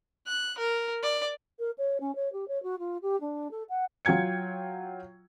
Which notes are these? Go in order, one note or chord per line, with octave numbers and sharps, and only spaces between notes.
F#6
A#4
D5
A#4
C#5
C#4
C#5
G4
C#5
F#4
F4
G4
D4
A4
F#5
F#3 F4 G5 G#6 C#7